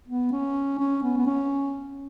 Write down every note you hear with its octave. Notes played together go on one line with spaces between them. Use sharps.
B3
C#4
C#4
B3
B3
C#4